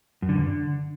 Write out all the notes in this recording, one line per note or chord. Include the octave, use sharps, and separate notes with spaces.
F#2
D3
G2
D3